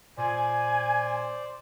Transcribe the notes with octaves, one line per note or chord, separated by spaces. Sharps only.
A#2 C5 D5 G#5